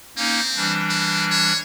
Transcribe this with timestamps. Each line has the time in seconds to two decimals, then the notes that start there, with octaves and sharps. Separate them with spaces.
0.17 A#3 C4 C#4 D#4
0.56 E3 G3 D4
0.90 A#3
1.30 C#5